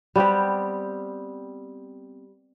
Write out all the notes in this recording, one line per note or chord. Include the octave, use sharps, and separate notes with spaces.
G3 B3 C4 G4